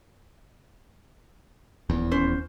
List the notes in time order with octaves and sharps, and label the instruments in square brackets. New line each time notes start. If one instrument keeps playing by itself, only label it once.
[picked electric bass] D#1 E2
[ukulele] C#4 C5